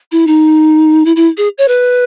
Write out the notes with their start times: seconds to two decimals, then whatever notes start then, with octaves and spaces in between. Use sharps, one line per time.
0.12 E4
0.27 D#4
1.05 E4
1.16 E4
1.37 G#4
1.58 C#5
1.68 B4